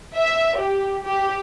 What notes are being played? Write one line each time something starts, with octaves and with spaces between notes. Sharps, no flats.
E5
G4
G4